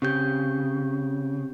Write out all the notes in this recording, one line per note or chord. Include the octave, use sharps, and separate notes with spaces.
C#3 C4 G4 G6